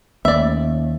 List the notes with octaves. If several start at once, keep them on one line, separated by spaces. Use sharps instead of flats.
D#2 A3 C#4 D5 E5